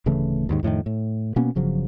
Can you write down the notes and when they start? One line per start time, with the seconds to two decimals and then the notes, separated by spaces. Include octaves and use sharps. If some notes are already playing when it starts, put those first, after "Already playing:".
0.06 D1 C#3 E3 A3
0.49 D#2 G#2 D#3
0.63 F2 A2 D3 D#3
0.86 A2
1.36 B2 A#3 B3 C#4
1.55 G1 C#3 F3 F#3